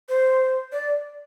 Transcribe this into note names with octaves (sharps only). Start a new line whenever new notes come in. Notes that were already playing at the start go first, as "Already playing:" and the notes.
C5
D5